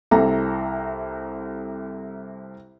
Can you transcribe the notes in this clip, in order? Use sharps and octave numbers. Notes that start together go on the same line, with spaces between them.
C2 C3 A4 A#5